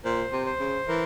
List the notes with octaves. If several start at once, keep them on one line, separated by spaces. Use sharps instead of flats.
A#2 C5
C3
C5
C#3
E3 A#4